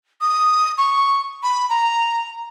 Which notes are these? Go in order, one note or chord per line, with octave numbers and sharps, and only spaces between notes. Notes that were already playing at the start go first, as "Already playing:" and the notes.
D#6
C#6
B5
A#5